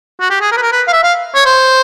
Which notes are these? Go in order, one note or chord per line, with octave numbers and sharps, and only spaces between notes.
F#4
G4
G#4
A#4
B4
A#4
B4
F5
E5
F5
C#5
C5